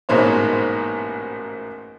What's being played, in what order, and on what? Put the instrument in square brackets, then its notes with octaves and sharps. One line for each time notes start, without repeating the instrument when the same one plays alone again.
[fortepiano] A1 G#2 B2 A#3 C5 C#5